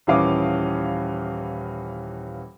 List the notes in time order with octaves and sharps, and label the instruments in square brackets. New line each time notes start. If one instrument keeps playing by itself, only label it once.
[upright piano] D#1 E3 C#4 F5 D6 D#6